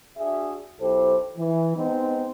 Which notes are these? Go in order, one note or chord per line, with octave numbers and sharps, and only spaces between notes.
D4 F#4 G#4 E5
B1 E4 G4 A4 C5
E3
G#3 B3 C4 D#4